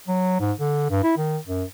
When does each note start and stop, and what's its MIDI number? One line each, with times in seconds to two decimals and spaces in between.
0.08 0.39 54
0.40 0.52 44
0.59 0.90 50
0.90 1.00 43
1.03 1.13 64
1.17 1.38 51
1.47 1.64 42